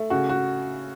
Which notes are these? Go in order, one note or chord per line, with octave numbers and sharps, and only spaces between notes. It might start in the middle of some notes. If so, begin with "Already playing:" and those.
Already playing: A3
C#3 F#4
F#4